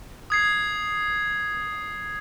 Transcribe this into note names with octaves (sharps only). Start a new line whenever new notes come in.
D#6 G#6 C7